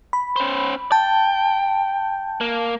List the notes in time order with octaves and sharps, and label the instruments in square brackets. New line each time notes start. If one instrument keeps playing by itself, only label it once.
[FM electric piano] B5
[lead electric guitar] C#4 C5
[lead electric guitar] G5 [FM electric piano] A5
[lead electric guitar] A#3